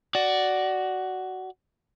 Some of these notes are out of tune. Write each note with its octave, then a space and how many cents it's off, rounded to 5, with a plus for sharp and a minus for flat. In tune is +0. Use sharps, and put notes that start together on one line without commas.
F#4 +10 D5 +0